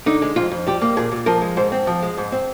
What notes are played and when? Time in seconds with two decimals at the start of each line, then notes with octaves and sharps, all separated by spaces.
0.06 D3 D#4
0.22 G#3
0.36 F2 F4
0.52 F2
0.67 G3 G4
0.81 A#3
0.97 A#2 G#4
1.12 A#2
1.26 F3 A#4
1.42 G#3
1.57 G#2 C5
1.72 C4
1.87 F3
2.02 G#3
2.17 G#2
2.32 C4